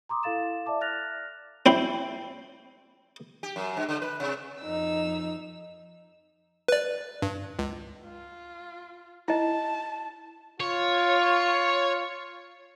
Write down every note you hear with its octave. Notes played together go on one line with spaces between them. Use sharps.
A#5 C6 D6 D#6
E4 A4 F5 A6 E7
D5 E5 A5 D6
F6 F#6 A6 A#6 F7
C4 E4 C5
G4
F#2
G2
D3
B4
C3
F2 D#4 E6
B4 D5
G2
C#2
F4
E4 D#5 A5
F4 C#5